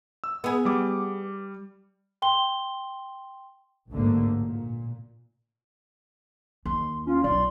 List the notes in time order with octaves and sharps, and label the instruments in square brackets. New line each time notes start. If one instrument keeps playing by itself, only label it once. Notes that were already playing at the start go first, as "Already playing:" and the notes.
[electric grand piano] E6
[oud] B3 G#4
[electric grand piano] G3 D6
[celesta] G5 C6 G7
[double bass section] A1 D2 G#2 D3 A3 A#3
A#2
[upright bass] D#2 [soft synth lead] C6
[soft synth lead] C#4 [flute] F4
[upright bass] B1 [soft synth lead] D5 [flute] C6